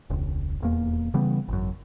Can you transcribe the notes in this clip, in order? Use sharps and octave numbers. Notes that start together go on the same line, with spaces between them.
E1 C#2
D#1 E2 A#3
C#3 E3 G3 B3
G#1 F#2